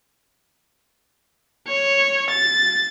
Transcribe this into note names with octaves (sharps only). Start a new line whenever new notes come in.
C#5
A6